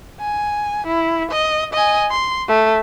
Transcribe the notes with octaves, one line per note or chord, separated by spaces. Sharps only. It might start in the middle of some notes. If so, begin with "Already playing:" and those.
G#5
E4
D#5
D#5 G#5
C6
A3